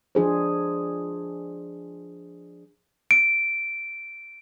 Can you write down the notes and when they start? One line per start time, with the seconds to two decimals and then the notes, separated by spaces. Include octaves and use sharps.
0.15 F3 D4 G#4 C5
3.11 D7